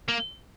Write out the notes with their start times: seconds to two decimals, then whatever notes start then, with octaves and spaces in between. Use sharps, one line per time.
0.09 A#3